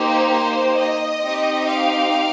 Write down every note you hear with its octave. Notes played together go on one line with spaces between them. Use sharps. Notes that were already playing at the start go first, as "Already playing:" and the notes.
Already playing: A#3 D#4 G4 C5
C5
D#5
C4 D#4 G4
F5